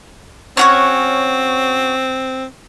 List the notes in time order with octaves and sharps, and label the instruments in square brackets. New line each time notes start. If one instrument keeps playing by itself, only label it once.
[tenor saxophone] C4 [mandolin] C#4 F#4 C#5